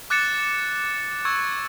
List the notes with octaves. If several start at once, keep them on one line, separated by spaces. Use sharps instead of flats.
D6 F#6 A6 C#7 E7
C#6 E6 G#6